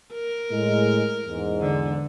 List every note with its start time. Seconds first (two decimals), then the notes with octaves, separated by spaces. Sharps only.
0.13 A#4
0.52 A2 G#3
1.27 E2 G#2
1.61 D3